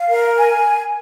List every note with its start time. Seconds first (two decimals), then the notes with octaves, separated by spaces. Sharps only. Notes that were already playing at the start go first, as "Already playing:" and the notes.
Already playing: F5
0.08 A#4
0.35 G#5